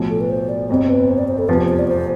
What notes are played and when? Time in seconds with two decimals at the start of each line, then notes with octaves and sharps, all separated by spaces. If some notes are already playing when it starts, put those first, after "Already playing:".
Already playing: B1 A2 F3
0.10 A4
0.21 B4
0.30 C5
0.49 D5
0.69 G1 F2 C3 C5
0.89 B4
1.09 C5
1.18 D5
1.28 C5
1.39 A4
1.48 F1 E2 C3 F3 B4
1.58 C5
1.68 C5
1.79 D5
1.88 C5